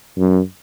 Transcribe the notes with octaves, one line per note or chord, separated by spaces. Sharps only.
F#2